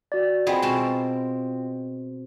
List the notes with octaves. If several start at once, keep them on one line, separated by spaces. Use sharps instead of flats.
F#4 D5
B3 C4 F4 G#4 D#5 G5
B2 C4 A5